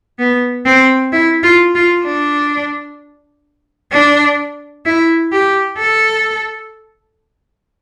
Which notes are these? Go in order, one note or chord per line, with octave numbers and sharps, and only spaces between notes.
B3
C4
E4
F4
F4
D4
D4
E4
G4
A4